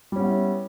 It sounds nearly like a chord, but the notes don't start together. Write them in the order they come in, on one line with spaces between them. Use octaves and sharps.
G3 C#4 B3 E4